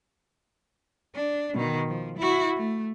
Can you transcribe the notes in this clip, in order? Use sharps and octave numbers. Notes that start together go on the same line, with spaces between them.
D4
B2 D#3
F3
E4 F#4
A3